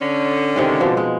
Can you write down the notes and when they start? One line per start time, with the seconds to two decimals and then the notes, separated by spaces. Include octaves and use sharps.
0.02 D3 C#4
0.56 C3 D#3 G#3
0.80 B2 F3
0.97 G#3